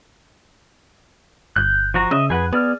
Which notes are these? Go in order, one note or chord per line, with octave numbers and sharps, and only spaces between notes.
G1 F#6 G6
F3 F#4 A#5
C#3 D#5 E5
F2 G#4 B4 F#5
B3 G#4 D5 F6